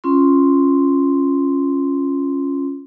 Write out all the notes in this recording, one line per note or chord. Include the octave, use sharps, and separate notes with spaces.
C#4 F4 C6